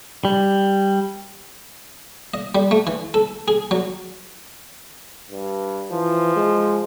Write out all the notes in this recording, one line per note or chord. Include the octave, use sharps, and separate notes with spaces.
G3
D#5
G3
A3
E3
A4
G#4
F#3
G2
E3 F3
G#3